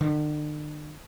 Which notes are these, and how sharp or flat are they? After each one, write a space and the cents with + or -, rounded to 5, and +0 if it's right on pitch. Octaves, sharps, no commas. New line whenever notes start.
D3 +45